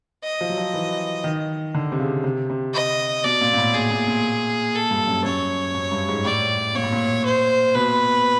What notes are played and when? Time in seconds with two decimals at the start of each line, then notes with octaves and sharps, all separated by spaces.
0.24 D#5
0.41 F3
0.49 F#3
0.58 F3
0.74 E3
1.24 D#3
1.75 D3
1.92 C3
1.99 C#3
2.24 C3
2.50 C3
2.74 D#5
3.24 B2 D5
3.41 A#2
3.53 A#2
3.58 A2
3.74 A#2 G#4
3.91 A#2
4.08 A#2
4.75 A4
4.91 G2
5.08 F#2
5.25 F#2 C#5
5.75 F#2
5.91 G2
6.09 G#2
6.25 A2 D5
6.75 A#2 C#5
6.83 A2
6.92 A#2
7.25 C5
7.74 B2 B4